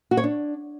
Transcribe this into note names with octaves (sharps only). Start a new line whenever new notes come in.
F#4
C#5
D4